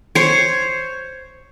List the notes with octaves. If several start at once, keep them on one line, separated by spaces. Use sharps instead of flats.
C5 C#5